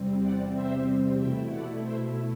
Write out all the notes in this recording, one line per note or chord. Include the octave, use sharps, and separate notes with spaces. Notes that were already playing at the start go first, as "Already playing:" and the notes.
Already playing: E2 C3 G3 C4
D5 F#5
C5 E5
B2 A3 E4 E5 G5
D5 F#5
C5 E5